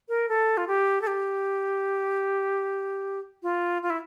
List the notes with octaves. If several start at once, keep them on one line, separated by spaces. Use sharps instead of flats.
A#4
A4
F4
G4
A4
G4
F4
F4
E4